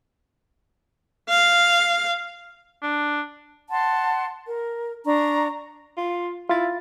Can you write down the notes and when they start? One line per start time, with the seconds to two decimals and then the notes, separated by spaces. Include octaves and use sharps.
1.29 F5
2.82 D4
3.70 F#5 A5 C6
4.46 A#4
5.05 D4 A#5 C#6
5.97 F4
6.49 E4 F4 A6